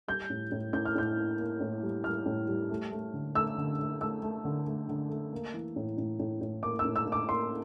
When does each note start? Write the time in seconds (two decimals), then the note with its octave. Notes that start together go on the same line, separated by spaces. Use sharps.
0.08 G3 G6
0.30 A2
0.52 A2
0.73 A2 G6
0.85 F6
0.95 A2 G6
1.17 A#3
1.39 A#3
1.60 A2
1.83 G3
2.04 G3 F6
2.26 A2
2.48 G3
2.70 A3
2.91 A3
3.14 D3
3.35 A3 E6
3.58 D3
3.80 A3
4.01 A3 E6
4.23 A3
4.45 D3
4.67 A3
4.89 D3
5.10 A3
5.33 A#3
5.54 E3
5.76 A2
5.98 A2
6.20 A2
6.41 A2
6.63 A#3 D6
6.79 E6
6.85 A2
6.96 E6
7.07 A2
7.12 D6
7.29 A#3 C6